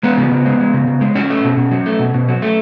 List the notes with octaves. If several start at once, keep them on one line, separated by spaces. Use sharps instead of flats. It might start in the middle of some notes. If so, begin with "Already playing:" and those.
G#3 B3
C#3
C#3
G#3
G#3
C#3
C#3
G#3
F#3 C#4
A3
B2
B2
F#3
A3
B2
B2
F#3
A3